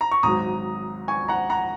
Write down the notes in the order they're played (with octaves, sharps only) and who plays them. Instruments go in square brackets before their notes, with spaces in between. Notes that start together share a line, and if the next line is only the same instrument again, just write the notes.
[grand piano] A#5
C#6
G#1 G#2 F#3 A#5 D#6
G#5 C#6
F#5 A#5
F#5 A#5